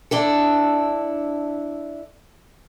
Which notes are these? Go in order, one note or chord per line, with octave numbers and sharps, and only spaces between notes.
D4 E4 A4